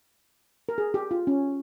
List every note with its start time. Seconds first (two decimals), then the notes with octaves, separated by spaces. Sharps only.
0.69 A#4
0.78 G#4
0.94 G4
1.11 F4
1.27 C#4